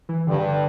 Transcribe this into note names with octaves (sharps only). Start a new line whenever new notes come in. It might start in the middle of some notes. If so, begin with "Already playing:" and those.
E3
G2 D3
C#3
D3